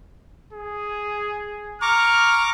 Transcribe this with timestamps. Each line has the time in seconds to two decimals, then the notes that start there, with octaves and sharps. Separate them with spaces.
0.53 G#4
1.82 A#5 C#6 D6 F6